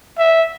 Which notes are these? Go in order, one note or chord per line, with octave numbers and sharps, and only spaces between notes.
E5